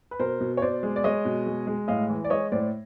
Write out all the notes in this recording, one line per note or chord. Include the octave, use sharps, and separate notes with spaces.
B4
B2 A#4 C5
B2
C#5
B2 C5 D5
G#3
D5
G#3 C#5 D#5
B2
G#3
G#3
A2 D#5 F5
E3
D5
G#3 C#5 D#5
A2 C5 D5